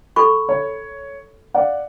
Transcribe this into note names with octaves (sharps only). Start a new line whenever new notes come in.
A4 B5 C#6
C#5
D5 F5 F#5